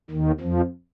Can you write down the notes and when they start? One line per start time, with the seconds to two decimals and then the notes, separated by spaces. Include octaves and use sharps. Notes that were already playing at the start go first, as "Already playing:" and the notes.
0.10 D#2 D#3
0.40 F2 F3